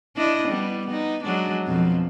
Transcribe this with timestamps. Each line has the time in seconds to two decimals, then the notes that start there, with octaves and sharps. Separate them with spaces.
0.17 D4 E4 D#5
0.48 G3 B3
0.87 B3 D#4
1.23 F#3 G#3 D4
1.67 F2 B2 F3